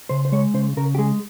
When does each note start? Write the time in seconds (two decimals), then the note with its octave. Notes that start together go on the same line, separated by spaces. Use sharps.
0.09 C#3 C5
0.25 C5
0.32 G#3 C#5
0.54 C#3 C5
0.77 C#3 A#4
0.95 G4
0.98 G#3 G#4